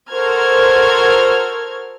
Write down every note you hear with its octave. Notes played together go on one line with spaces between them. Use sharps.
F#4 A4 A#4 C5 F6 G#6